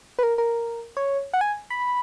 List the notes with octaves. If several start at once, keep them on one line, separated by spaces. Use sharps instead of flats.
B4
A#4
A#4
C#5
F#5
G#5
B5